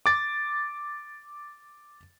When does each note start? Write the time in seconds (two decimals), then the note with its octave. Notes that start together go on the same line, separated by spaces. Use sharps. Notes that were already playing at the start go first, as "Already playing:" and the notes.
0.06 D6 A6